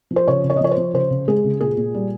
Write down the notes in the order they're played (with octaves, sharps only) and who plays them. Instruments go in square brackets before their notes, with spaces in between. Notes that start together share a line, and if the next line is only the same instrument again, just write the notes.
[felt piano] F3
C5
C#3 C#5
C#3
C#5
D#5
F3 C#5
C5
F3
C#3 C5
C#3
G#3 G#4
C#3
A#2 G#4
A#2
G3